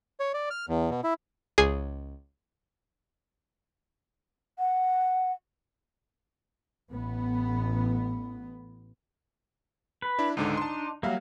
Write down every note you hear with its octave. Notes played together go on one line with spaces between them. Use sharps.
C#5
D5
F6
E2
B2
E4
C#2 G#4 C7
F#5
A1 B3
B4
D4 E4
C#2 G#2 D3 D4 D#4
A5 C6
F#3 G3 A#3 E5 F5